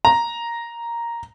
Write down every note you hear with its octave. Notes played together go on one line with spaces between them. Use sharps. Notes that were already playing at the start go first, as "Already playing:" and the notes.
A#5